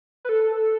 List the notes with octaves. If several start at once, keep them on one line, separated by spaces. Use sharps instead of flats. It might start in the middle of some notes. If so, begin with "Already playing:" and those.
B4
A4